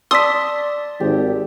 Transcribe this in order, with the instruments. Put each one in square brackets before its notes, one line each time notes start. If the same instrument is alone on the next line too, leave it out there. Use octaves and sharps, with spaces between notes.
[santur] D5 A5 [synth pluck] C6 D#6 [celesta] E6 B6
[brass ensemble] G#1 [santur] G4